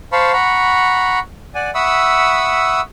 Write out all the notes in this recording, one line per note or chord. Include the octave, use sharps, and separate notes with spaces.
C5 F5 A5 B5 C#6
F#5 A#5 B5 C#6
D5 F#5 G#5
E5 F#5 B5 C#6 D#6 E6